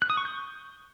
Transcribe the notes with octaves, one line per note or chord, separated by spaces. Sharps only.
F#6
D#6
C#6
G6